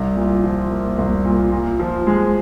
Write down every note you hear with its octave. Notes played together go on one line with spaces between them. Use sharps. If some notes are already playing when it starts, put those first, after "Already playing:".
Already playing: C2
A#2
F3
A#3
C2
A#2
A#2
F3
G#3